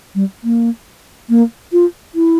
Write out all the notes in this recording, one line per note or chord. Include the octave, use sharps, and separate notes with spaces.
G3
A#3
A#3
F4
E4